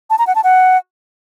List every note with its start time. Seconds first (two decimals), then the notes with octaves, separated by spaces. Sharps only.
0.10 A5
0.19 A#5
0.27 F#5
0.35 A5
0.44 F#5